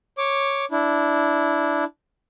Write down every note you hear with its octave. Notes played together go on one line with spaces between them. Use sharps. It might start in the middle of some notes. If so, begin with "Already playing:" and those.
C#5 D6
D4 E4